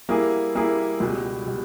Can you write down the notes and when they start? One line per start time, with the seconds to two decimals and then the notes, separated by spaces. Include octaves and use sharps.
0.09 G3 A#3 E4 G#4
0.55 G3 A#3 E4 G#4
1.00 C#2 B2 G3
1.47 B2 G3